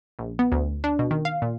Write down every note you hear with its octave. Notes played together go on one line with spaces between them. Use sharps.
A#1
B3
D2
D4
B2
D#3
F5
A#2